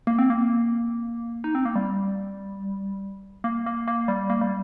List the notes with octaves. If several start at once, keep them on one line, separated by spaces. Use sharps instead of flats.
A#3
C4
A#3
D#4
C4
A#3
G3
A#3
A#3
A#3
G3
A#3
G3